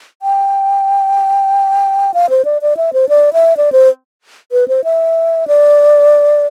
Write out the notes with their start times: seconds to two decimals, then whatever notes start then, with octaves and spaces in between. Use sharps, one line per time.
0.22 G5
2.14 F5
2.30 C5
2.45 D5
2.62 D5
2.77 E5
2.93 C5
3.09 D5
3.33 E5
3.57 D5
3.72 C5
4.52 B4
4.68 C5
4.84 E5
5.48 D5